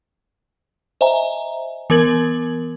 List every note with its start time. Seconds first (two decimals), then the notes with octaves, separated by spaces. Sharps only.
1.01 C5 D#5 E5 G#5 A#5
1.90 E3 B3 A#4 G#6 F#7